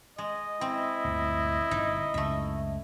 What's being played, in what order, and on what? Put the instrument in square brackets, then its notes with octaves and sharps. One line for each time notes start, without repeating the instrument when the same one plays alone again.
[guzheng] G#3 [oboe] D#5
[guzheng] C4 [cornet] E4
[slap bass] D2 G2 A#2
[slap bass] G1 A#2 [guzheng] D#4
[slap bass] C#2 F#2 [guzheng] A3 E5